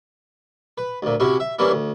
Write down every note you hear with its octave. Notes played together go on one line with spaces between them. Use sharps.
B4
D2 A#2
C3 C#4 E4 F#4
E5
E3 G3 A#3 C#4 E4
D2